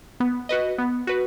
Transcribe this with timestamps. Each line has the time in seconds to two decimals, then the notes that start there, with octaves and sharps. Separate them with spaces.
0.20 B3
0.49 F#4 B4 D#5
0.78 B3
1.07 F#4 B4